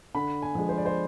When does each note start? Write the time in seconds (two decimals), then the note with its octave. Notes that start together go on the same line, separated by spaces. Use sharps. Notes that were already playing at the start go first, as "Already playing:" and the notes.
0.15 D3 B5
0.42 G#5
0.55 F3 G#3
0.69 C5
0.77 D5
0.85 C5